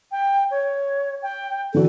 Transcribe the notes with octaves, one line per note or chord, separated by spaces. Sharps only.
G5
C#5
G5
D3 E3 F#4 A4